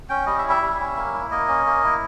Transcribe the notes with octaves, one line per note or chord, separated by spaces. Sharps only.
C#4 G5
G3 D#5
E5
E4
E5
G3
C#4
A#3
E4
A#3 D#5
C#4
A#3
E4